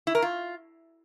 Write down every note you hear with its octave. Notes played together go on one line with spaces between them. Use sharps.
E4
A#4
F4